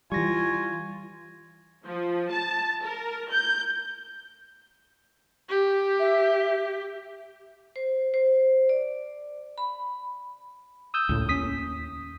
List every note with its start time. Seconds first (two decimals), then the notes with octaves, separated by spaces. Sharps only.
0.12 E3 G3 F4 G#5 C#6 A#6
1.84 F3
2.30 A5
2.83 A#4
3.30 G6
5.49 G4
6.00 E5
7.76 C5
8.14 C5
8.69 D5
9.58 B5
10.94 D#6 E6 G6
11.09 C#2 A2
11.29 D#2 C#4 D#6 B6